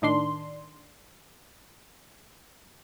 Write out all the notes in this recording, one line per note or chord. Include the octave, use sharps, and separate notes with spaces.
A2 D#3 D4 C6